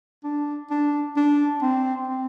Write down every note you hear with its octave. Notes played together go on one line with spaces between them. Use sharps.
D4
D4
D4
C4
C4